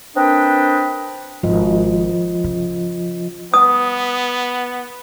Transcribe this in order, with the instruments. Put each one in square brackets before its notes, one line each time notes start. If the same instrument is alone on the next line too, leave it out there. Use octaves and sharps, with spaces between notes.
[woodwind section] C4 D4 A#4 B4 D#5 G5
[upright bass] G#1 [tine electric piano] F3 F4 D#5
[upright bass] C#3
[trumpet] B3 [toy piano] D#6